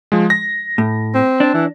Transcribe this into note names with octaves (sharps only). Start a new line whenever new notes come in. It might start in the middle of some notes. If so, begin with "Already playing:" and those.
F3 G#3
A#6
A2
C4
D4
E3